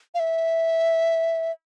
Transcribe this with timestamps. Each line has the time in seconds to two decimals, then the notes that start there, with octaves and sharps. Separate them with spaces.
0.14 F5
0.20 E5